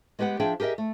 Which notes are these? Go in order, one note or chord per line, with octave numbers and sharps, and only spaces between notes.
G#3 B3 G4 B4 F#5
F3 D4 G#4 E5 G5
G4 G#4 A#4 D#5 E5
A3